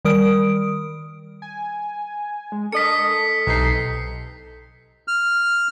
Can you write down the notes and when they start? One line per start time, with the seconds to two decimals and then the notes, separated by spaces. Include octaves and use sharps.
0.05 D#3 G3 A#4 D#6 D7
1.42 G#5
2.52 G#3
2.72 D4 A4 A#4 D#5 B6 C#7
3.47 B1 C3 E3 D#4 C7
5.08 F6